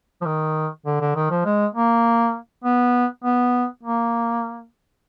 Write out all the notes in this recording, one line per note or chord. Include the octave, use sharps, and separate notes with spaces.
F3
D#3
D3
D3
D#3
F3
G#3
A#3
B3
B3
A#3